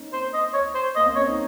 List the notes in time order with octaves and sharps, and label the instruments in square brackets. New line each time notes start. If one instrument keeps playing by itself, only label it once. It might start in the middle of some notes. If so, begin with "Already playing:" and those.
Already playing: [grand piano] A#3 C4 C#4 D#4
[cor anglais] C5
D#5
C#5
C5
[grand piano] A#3 [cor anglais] D#5
[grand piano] C4
[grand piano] C#4 [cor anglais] C#5
[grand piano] D#4